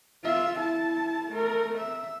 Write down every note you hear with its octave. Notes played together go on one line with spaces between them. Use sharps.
F4 E5
E4 A5
A3 A#4
E5